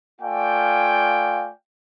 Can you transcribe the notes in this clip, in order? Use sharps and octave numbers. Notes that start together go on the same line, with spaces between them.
A3 F4 D5 F5 G5 G#5